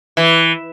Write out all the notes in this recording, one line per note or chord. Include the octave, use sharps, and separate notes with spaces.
E3